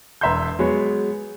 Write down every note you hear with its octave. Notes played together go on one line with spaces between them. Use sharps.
E1 B4 E5 A#5 C6 G6
F#3 G#3 B3 C#5